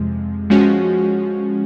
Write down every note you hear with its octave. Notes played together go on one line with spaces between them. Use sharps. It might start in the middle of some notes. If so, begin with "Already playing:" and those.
Already playing: F2 C3 F3 G#3
F3 G#3 C#4 F#4